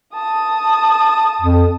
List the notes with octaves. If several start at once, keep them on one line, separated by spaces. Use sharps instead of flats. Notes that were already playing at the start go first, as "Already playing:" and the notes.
A5 D#6
F2